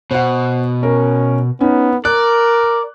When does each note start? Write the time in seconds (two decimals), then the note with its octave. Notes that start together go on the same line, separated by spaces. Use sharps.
0.11 B2 C5 F#5
0.83 C#4 A#4
1.61 B3 C#4 D#4
2.05 A#4 D5 F#6